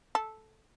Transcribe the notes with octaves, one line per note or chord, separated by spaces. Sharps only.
A4